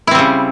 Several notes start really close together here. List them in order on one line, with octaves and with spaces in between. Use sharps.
E4 C4 G3 C#3